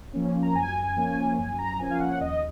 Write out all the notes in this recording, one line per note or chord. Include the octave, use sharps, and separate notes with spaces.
F3 A#3 C#4
A#5
F#2 G#5
F3 A#3 C#4
F#2 G#5
A#5
F3 A#3 C#4 G#5
F5
F#5
D#2 D#5